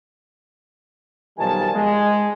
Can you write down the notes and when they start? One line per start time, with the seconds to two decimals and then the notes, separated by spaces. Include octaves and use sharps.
1.39 B1 D#3 F3 G3 G#5 A5
1.75 G#3